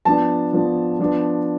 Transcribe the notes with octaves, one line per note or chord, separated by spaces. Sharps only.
F3 B3 D4 A5
F3 B3 D4
F3 B3 D4